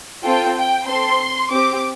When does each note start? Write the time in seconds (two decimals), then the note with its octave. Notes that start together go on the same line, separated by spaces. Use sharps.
0.24 C4 F4 A4 G5
0.56 G5
0.87 C4 A4 C6
1.52 C4 G4 D6